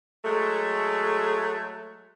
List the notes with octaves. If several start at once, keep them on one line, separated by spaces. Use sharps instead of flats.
F#3 G#3 A3